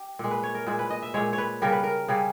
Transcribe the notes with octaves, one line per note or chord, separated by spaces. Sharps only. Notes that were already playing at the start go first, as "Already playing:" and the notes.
Already playing: G4
A#2 G#3
B4
C#5
A#4
A#2 G#3
B4
D#5
E5
A#2 G#3 C#5
C#5
B4
C#3 G3 A#4
B4
A#4
C#3 G3 G#4